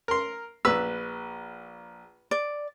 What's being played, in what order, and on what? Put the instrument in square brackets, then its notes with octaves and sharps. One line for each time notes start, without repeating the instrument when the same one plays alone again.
[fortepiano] A#4 C6
[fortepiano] A#1 E6 [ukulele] B4
[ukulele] D5